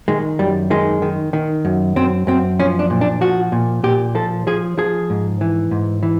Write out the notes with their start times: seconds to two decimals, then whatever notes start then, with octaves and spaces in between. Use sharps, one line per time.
0.08 D#3 G#3
0.39 F#2 G3
0.70 D#3 G#3
1.02 D#3
1.33 D#3
1.65 F#2
1.96 F#2 C4
2.27 F#2 C4
2.59 F3 C#4
2.79 D4
2.90 A#2
3.01 D4
3.21 F3 F#4
3.52 A#2
3.84 A#2 G4
4.15 F3 A4
4.47 F3 G#4
4.78 F3 G#4
5.10 G#2
5.41 E3
5.71 G#2
6.03 E3